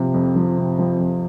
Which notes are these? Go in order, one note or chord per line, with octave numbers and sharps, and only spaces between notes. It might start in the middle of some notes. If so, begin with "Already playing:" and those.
Already playing: C3 F3
F2
F3
C3
F3
F2